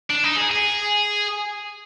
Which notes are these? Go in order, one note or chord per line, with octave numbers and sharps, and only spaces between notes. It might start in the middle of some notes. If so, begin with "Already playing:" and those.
D4
D#4
G#4
G#4